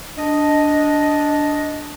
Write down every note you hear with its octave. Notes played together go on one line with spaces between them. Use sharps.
D4 D#5